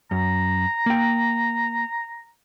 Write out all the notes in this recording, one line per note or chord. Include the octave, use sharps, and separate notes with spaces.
F#2 A#5
A#3 G5